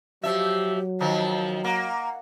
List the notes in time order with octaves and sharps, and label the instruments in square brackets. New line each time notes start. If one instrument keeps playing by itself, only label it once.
[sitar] F3 E5 [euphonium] F#3 [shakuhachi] G4
[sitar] D#3 F3 [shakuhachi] A5
[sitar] A#3 [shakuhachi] F#5